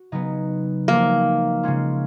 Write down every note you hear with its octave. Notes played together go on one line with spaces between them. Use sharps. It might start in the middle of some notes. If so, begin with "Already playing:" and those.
Already playing: F#4
C#3 F#3 B3 D#4
F3 G#3 A#3 D#4 F#4
C#3 G#3 C#4 F4